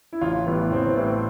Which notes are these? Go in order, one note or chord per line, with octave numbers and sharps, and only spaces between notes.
E4
A1 F4
A2 E3 G3 B3
A1 C4
A2 E3 G3 C4